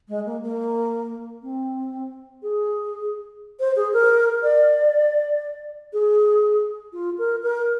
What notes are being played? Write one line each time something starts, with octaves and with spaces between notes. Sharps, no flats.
G#3
A#3
A#3
C4
G#4
C5
G#4
A#4
D5
G#4
F4
A#4
A#4